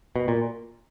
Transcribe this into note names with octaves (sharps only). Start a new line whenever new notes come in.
B2
A#2